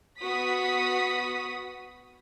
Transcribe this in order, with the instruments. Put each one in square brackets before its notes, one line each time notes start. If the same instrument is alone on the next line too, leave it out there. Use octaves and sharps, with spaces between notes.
[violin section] B3 F#4 D#6 B6